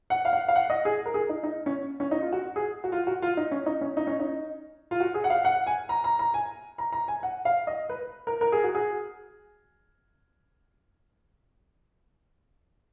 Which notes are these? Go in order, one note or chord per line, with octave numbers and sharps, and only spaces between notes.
F#5
F5
F#5
F5
F#5
D#5
G#4
A#4
G#4
D#4
D#4
C#4
C#4
D#4
F4
F#4
G#4
F#4
F4
F#4
F4
D#4
C#4
D#4
C#4
D#4
C#4
D#4
F4
F#4
G#4
F#5
F5
F#5
G#5
A#5
A#5
A#5
G#5
A#5
A#5
G#5
F#5
F5
D#5
B4
A#4
A#4
G#4
F#4
G#4